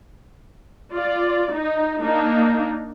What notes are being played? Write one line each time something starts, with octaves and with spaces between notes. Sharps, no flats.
F4 D5
D#4
A#3 D4 D#4